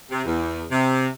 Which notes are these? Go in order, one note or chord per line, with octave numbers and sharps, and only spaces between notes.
C3
E2
C3